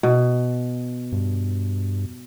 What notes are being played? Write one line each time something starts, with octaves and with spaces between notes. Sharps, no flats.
B2
G2